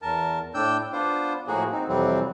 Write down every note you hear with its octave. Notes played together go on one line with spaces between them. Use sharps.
E2 A#4 A5
A2 D4 G5 E6 G6
B3 D4 F4 C5
A2 F3 A#3 F#4 G#4
C4 D#4
F2 C3 E3 F#3 G3 C4